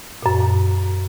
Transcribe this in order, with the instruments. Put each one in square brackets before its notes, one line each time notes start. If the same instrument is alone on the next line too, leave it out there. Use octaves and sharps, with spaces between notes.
[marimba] F#2 A#2